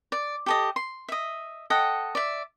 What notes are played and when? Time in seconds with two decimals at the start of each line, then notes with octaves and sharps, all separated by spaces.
0.12 D5
0.46 G4 A4 D#5
0.76 C6
1.09 D#5 E5
1.70 A4 D#5 F#5 G5
2.15 D5 E5